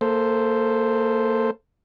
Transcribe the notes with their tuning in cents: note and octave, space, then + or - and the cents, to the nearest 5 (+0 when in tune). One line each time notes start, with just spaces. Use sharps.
A#3 -25 A4 +0 C5 +0